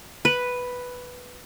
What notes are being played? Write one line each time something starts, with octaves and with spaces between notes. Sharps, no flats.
B4